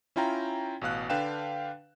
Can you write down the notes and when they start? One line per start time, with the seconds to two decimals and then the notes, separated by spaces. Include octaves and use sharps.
0.16 C#4 E4 F4 G5 A#5
0.81 A1 B2 F5 F#6
1.10 D3 D4 B4 F5 G5 E7